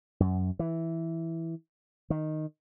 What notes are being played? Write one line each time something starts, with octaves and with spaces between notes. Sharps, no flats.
F#2
E3
D#3